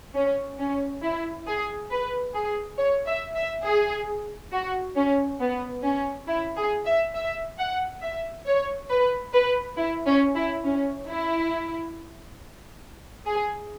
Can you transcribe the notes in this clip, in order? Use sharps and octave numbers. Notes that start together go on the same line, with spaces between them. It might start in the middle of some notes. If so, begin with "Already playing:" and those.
C#4
C#4
E4
G#4
B4
G#4
C#5
E5
E5
G#4
F#4
C#4
B3
C#4
E4
G#4
E5
E5
F#5
E5
C#5
B4
B4
E4
C#4
E4
C#4
E4
G#4